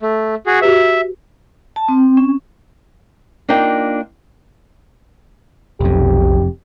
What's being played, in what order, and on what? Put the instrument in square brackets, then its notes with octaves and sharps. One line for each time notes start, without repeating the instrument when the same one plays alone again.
[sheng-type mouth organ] A3
F#4 G#4
[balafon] F#4 G4 B4 [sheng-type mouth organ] E5
[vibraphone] A5
C4
C#4
[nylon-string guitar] A#3 D4 D#4 F4 G5
[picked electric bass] F1 F2 [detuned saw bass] B1 [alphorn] G4